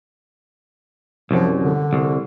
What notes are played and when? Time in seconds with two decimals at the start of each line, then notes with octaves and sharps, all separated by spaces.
1.31 C2 F#2 F3
1.61 D3
1.93 C2